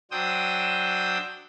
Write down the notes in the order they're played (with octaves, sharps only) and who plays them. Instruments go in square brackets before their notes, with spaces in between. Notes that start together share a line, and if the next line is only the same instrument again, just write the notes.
[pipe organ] F#3 D4 C5 G5 D#6 E6